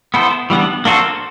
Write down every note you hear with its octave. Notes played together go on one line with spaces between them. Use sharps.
B3 E4 A4 C5
E3 G3 B3 D4
A#3 D4 F#4 A4 C5